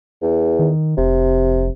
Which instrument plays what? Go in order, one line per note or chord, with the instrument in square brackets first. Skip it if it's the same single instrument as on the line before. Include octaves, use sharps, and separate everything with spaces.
[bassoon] E2
[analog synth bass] D#3
[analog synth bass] F1 [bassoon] C3